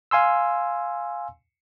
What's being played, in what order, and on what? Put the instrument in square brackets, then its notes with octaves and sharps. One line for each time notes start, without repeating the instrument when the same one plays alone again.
[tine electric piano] F5 G#5 C6 E6